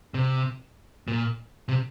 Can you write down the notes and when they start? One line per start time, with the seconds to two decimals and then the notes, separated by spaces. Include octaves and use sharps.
0.14 C3
1.08 A#2
1.69 C3